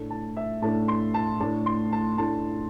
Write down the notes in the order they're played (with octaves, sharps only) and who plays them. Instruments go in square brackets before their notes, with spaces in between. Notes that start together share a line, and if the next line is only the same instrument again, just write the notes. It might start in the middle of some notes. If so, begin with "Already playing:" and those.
Already playing: [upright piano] A2 A3 D4
A5
E5
A2 A3 D4 A5
C6
A5
A2 A3 D4 A5
C6
A5
A2 A3 D4 A5